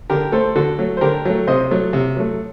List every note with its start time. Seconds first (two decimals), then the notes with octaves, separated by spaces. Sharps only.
0.10 D3 G4 A#4
0.32 A3 A4 C5
0.56 D3 F#4 A4
0.79 F#3 A3
0.97 C5
1.01 D3 G4 A#4
1.25 F#3 A3
1.47 C3 C5 D#5
1.71 F#3 A3
1.93 C3
2.17 F#3 A3